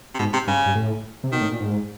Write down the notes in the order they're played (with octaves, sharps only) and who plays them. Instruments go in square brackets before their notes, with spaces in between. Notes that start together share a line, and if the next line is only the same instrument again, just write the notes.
[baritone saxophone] C3
[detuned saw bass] G#2 [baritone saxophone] B2
[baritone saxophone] C3
[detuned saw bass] G2 [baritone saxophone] C#3
[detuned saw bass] G2
A2
C3
[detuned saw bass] B2 [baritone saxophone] D#3
[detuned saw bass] A2
A#2
G#2